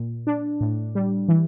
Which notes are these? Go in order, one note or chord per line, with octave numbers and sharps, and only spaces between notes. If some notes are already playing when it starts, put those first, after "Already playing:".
Already playing: A#2
D4
A2
G3
E3